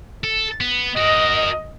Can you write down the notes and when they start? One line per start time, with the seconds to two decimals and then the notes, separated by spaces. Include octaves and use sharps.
0.24 A4
0.61 B3
0.97 F#4 A#4 D#5